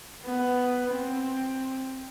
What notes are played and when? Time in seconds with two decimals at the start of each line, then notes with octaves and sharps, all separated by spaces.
0.23 B3
0.90 C4